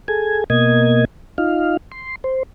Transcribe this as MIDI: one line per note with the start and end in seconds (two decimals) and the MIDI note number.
0.08 0.44 68
0.08 0.44 69
0.08 0.44 80
0.50 1.05 47
0.50 1.05 58
0.50 1.05 75
0.50 1.05 92
1.38 1.77 63
1.38 1.77 65
1.38 1.77 77
1.92 2.16 84
2.24 2.43 72